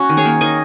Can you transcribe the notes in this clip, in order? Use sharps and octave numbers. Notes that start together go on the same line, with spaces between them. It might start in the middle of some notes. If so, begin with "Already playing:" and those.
Already playing: C#4 F#4
D#3
G#4 C#5
A#3
D#3 D#5 G#5